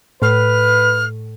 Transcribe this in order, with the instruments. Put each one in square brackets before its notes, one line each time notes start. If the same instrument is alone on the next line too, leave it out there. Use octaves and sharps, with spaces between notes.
[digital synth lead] A2 [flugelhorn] B4 [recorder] F6